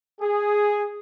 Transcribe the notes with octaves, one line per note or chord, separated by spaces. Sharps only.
G#4